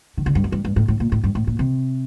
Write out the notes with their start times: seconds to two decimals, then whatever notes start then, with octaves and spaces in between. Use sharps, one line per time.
0.18 D#3
0.26 D3
0.35 G2
0.44 F#2
0.52 G2
0.65 G2
0.76 A2
0.88 A2
1.00 A#2
1.12 A2
1.24 G2
1.35 A2
1.47 A#2
1.59 C3